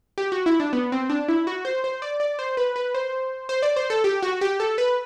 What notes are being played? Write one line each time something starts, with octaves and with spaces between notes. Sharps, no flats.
G4
F#4
E4
D4
B3
C4
D4
E4
F#4
C5
C5
D5
D5
C5
B4
B4
C5
C5
D5
C5
A4
G4
F#4
G4
A4
B4